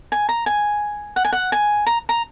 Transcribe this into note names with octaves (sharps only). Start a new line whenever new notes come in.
G#5
A#5
G#5
F#5
G#5
F#5
G#5
A#5
A#5